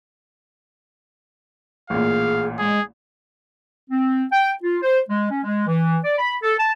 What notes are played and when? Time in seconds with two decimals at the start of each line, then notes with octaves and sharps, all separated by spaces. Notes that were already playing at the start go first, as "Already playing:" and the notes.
1.90 A1 A#2 G#4 F5
2.59 G#3 G#4
3.90 C4
4.32 G5
4.63 F4
4.83 C5
5.08 G#3
5.31 C#4
5.44 G#3
5.68 E3
6.04 D5
6.19 B5
6.43 A4
6.58 A5